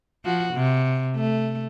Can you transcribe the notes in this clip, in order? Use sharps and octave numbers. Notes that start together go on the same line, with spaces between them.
F3 F#4
C3
A3